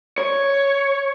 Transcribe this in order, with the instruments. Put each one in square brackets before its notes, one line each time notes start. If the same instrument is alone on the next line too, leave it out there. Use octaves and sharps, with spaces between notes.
[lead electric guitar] C#5